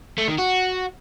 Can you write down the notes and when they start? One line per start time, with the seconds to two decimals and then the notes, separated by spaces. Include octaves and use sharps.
0.18 A3
0.28 D#3
0.38 F#4